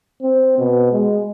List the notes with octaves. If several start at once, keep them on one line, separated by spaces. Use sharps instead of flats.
C4
B2
G#3